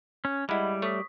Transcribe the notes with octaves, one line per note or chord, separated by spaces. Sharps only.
C#4
G3 G#3 E4 D#5 F#5 B5
A3 C#5 C#6 D#6 B6